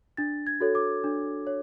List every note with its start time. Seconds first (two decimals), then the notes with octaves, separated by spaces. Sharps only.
0.17 D4 A6
0.47 G#6
0.60 F#4 A4 C#5
0.75 D6
1.04 D4
1.47 C#5